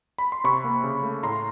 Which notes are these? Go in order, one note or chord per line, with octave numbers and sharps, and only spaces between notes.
B5
C6
C3 B5 C#6
A#3
C#3
A3
A2 A#5 C6